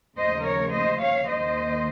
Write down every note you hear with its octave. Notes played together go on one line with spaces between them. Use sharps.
D#2 C#3 F3 A3 C5 D#5
A#4 C#5
C5 D#5
C#5 F5
D#2 D#3 A#3 C5 D#5